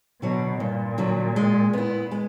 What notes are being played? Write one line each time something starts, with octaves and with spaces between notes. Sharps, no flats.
B2 D3 F#3
G2 A#2
D3 F#3
G#3
B3 E4
G#3